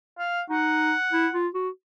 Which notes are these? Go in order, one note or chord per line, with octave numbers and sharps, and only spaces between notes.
F5
D#4 F#5
E4
F4
F#4